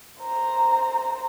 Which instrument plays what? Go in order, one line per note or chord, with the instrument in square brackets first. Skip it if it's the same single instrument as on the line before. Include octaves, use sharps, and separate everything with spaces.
[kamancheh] C5 A#5